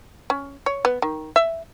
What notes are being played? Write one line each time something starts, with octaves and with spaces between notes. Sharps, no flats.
C#4
C#5
B3
D#3
E5